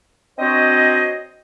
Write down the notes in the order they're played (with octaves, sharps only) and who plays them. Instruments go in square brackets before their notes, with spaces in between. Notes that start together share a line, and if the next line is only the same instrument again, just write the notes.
[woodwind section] C4 D4 F#4 C5 C#5 D#5